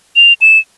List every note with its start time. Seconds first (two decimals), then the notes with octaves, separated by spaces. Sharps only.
0.16 F7
0.41 E7